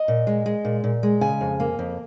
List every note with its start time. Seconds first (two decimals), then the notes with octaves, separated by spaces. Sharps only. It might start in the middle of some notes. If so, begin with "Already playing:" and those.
Already playing: D#5
0.08 A#2
0.27 G#3
0.46 G#3
0.65 A#2
0.84 A#2
1.03 G#3
1.21 C#3 G#5
1.41 F2
1.60 A#3
1.79 F2